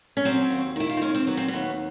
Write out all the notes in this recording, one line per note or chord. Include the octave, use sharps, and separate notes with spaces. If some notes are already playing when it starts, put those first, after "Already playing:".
C#4
F#3 C4
D#2
D#3 E4
F4
C4
D#2 C#4
C4
F#3 B3
C4
D#2 B3